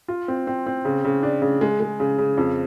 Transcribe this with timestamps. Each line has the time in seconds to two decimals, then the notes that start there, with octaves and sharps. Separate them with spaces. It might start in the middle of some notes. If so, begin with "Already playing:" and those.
0.08 F4
0.28 C4
0.47 C4
0.66 C4
0.85 C#3
1.05 C#3
1.23 D4
1.42 C#3
1.61 G#3
1.80 G#3
2.00 C#3
2.18 C#3
2.38 F2